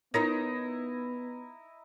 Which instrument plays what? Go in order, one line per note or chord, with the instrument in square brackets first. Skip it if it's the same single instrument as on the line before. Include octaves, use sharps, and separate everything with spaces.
[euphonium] B3 [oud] D#4 A#4 C#5 [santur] E4 D#5 A#5